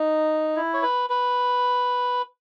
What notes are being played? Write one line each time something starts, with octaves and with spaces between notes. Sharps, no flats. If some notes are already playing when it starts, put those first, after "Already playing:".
Already playing: D#4
E4
C#5
B4
B4